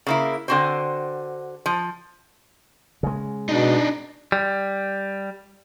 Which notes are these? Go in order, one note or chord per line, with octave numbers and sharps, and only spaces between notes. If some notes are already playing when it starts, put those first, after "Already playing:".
C#3 A#3 E4
D3 C4 F#4 G4 C5
F3
C#3 G#3
B2 D4 D#4
G3